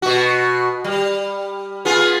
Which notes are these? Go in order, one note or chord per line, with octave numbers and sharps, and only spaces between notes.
B2 F#4
G3
B3 F4 G#4